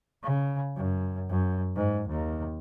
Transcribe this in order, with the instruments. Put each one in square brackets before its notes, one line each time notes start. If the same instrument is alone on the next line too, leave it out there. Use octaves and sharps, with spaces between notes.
[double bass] C#3
F#2
F#2
G#2
D#2